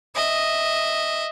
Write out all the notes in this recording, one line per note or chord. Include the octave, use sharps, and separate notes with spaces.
D#5 E5